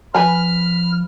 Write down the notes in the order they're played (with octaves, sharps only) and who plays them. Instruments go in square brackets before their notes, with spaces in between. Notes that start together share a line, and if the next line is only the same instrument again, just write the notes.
[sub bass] F3 [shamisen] B4 G#5 A#5 [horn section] B5 [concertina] F6